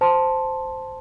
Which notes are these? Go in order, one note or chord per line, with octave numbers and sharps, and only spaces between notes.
C5 A5 C6